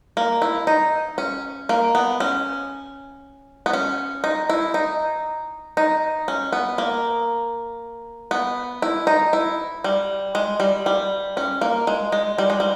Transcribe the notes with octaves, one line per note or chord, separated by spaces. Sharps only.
A#3
E4
D#4
C#4
A#3
B3
C#4
B3
C#4
D#4
E4
D#4
D#4
C#4
B3
A#3
B3
E4
D#4
E4
G3
G#3
G3
G3
C#4
A#3
G#3
G#3
G3
G#3
G3